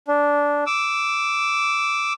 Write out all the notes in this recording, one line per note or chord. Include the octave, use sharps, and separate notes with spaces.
D4
D6 E6